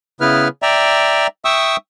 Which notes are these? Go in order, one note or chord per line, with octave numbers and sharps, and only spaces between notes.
C#3 B3 E4 B4 F6
D5 E5 G5 A#5
E5 G5 C#6 D#6 E6